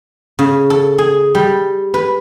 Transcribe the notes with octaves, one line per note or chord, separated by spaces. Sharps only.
C#3
A4
G#4
G3
B4